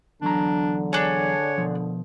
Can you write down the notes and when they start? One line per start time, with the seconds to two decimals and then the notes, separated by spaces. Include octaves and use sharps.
0.22 E2 D3 F#3 D4 A#5
0.93 D4 G#4 C#5
1.58 B2 F3